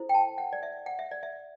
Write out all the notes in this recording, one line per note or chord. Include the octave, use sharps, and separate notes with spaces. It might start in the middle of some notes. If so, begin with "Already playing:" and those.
Already playing: E4 A4 C5
G5
A5
F#5
D5
E5
F#5
E5
D5
E5